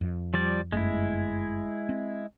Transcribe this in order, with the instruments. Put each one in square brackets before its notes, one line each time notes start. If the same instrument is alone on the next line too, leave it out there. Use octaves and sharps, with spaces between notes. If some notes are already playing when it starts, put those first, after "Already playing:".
[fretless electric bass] F2
[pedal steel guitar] F3 G3 D5
[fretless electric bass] G1 F#2 A3 [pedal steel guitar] G#3 E4
[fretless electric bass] C4